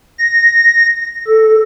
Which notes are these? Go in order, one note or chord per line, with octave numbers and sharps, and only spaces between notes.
A#6
A4